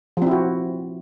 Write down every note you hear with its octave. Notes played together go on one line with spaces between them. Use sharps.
F3 C4 E4 F#4